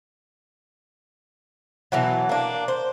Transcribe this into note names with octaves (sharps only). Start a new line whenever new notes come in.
B2 E3 F#3
A#3 D4
C5